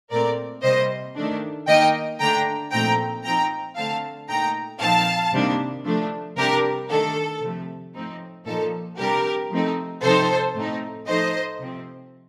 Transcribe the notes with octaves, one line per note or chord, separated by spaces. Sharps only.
A#2 A3 C4 A#4 D5
C3 G3 A#3 C5 D#5
D#3 A3 D4
D#3 A#3 D#4 D#5 G5
D3 A3 D4 G5 A#5
A#2 F3 A3 C4 D#4 G5 A#5
F3 C4 D#4 G5 A#5
D3 A3 C4 F5 A5
A#2 A3 D#4 G5 A#5
A#2 F3 C4 D#4 F5 A5
C3 D#3 G3 A#3 D4
F3 A3 D4
C3 G3 D4 G4 A#4
D#3 A3 D4 A4
C3 F3 A3
A2 F3 C4 D#4
A#2 F3 A#3 D#4 A4
C3 G3 D4 G4 A#4
F3 A3 C4 D#4
C3 F3 C4 D#4 A4 C5
A2 A3 C4 D#4
F3 A3 D#4 C5 D#5
C3 F3 C4